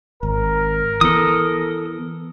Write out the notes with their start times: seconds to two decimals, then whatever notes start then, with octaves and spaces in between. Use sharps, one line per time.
0.23 G#1 A#4
1.01 E3 B3 A4 D#6